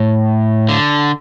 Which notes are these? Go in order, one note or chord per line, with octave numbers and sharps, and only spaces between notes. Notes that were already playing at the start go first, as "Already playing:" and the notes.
Already playing: A2
D3